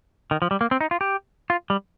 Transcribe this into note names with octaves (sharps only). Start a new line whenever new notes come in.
D#3
F3
G3
A#3
C4
D#4
F4
G4
F4
G3